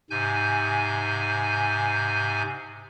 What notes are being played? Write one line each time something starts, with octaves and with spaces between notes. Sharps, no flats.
G#2 C3 G#5 G6